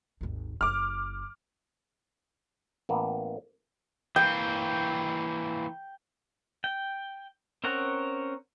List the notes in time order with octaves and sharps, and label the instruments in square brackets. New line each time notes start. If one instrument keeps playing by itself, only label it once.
[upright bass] G#1 D#2
[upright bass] F#1 E4 [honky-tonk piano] D6 F6
[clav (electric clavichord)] A1 A#3 B3
[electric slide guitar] E3 A#3 [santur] G5
[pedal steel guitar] G5
C4 C#4 A#4 C#5 F#5